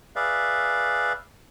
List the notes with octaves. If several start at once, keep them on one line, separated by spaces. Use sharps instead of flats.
G#4 B4 D5 E5 F5